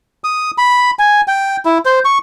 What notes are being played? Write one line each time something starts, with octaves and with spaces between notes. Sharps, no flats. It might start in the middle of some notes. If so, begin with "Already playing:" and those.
D#6
B5
G#5
G5
E4
C5
C#6